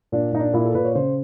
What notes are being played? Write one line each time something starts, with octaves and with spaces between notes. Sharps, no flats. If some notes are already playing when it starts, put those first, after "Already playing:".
A#2 D4
A#2 D#4
D4
A#2 E4
A4
A#2 B4
C#5
C#3 C5